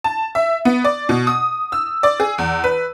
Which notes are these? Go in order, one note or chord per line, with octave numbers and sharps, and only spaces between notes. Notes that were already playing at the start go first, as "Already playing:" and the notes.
A5
E5
B3
D5
B2
D#6
E6
D5
G#4
E2
B4